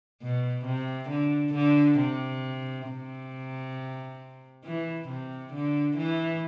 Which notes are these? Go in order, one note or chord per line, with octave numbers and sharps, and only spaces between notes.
B2
C3
D3
D3
C3
C3
E3
C3
D3
E3